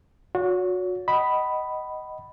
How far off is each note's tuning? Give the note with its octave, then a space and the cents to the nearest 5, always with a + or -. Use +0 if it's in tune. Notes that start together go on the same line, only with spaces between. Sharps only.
F#4 -30 C#5 +35
D#5 +0 F#5 +35 B5 +0